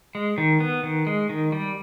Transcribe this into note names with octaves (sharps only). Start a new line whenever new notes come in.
G#3
D#3
B3
D#3
G#3
D#3
G3